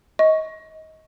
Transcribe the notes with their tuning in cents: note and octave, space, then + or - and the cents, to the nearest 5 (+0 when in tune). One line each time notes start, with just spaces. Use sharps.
D#5 +25 C#6 +0